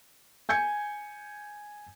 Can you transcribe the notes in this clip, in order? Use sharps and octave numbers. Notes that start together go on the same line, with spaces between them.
G#5 G6 G#6 C#7